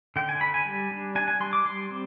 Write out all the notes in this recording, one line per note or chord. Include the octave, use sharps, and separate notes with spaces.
D3 G5
G#5
D3 B5
G#5
G3
D4
D4 G#5
G#5
G3 C6
D6
G3 C6
C4